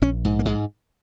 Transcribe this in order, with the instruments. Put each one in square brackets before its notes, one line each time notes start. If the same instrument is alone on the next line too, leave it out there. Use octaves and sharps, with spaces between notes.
[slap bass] A#1 C#4
G#2
A#3
G#2 G#3